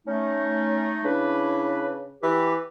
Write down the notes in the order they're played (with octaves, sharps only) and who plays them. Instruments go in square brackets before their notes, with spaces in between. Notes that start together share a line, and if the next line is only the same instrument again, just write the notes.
[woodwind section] A3 D#4 [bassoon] C#4
[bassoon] C#3 [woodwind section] D4 E4 B4
[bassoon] E3 [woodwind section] G4 B4